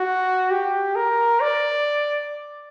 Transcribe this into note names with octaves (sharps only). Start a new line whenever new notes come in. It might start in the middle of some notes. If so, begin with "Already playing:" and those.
Already playing: F#4
G4
A#4
D5